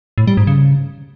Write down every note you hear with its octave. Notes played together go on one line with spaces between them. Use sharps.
A2
G3
G#2
C#3